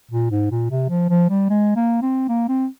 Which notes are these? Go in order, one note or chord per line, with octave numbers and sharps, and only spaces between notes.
A#2
G#2
A#2
C3
F3
F3
G3
G#3
A#3
C4
A#3
C4